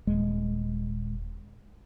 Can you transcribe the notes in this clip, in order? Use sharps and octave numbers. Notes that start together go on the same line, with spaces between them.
D#1 G#3